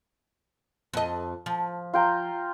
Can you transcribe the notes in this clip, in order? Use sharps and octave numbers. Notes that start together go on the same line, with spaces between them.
F2 D#5
F3
F4 G5 A#5